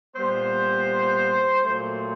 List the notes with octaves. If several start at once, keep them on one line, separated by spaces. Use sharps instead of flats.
A#2 G3 B3 C5
A#2 F#3 A3 C5